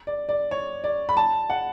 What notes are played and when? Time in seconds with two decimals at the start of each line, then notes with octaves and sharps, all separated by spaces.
0.07 D5
0.29 D5
0.51 C#5
0.84 D5
1.09 B5
1.17 A5
1.50 F#5